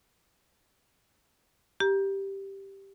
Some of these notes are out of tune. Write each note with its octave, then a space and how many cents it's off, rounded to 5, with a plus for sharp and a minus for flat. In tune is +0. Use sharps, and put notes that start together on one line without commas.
G4 +0 A#5 +25